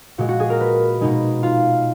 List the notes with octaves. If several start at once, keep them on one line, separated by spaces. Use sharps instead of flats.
A#2 G#3 F#4
F#4
G#4
A#4
B4
B2 G#3 D#4
F4